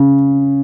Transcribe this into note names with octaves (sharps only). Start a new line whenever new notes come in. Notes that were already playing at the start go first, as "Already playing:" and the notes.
Already playing: C#3